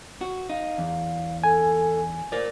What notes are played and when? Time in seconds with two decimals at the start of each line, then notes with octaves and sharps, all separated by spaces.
0.21 F#4
0.50 D#4 F5
0.78 E2
1.44 A4 G#5
2.32 A#4 C5 D5